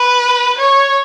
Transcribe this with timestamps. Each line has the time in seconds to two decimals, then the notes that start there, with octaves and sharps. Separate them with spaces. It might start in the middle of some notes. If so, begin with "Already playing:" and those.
Already playing: B4
0.58 C#5